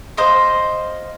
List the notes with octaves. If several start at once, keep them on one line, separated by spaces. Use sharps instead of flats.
C5 D#5 F5